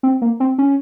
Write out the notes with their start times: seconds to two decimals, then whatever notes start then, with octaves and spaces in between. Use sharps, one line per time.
0.03 C4
0.22 A#3
0.40 C4
0.58 C#4